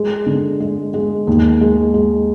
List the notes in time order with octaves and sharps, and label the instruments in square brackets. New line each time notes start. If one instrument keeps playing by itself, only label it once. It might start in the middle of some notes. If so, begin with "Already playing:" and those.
Already playing: [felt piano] G#3
D3
G#3
G#3
D#2
G#3
G#3